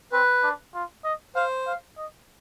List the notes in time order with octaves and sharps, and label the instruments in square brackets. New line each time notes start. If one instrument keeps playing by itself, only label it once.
[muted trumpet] C4 [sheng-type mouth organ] B4
[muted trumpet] D4
F4
D#5
[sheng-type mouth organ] C5 [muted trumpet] F5
[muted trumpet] F5
D#5